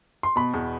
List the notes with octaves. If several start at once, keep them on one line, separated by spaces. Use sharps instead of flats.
C6
B2 B5
E2